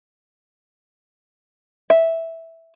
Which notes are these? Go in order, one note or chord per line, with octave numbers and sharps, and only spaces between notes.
E5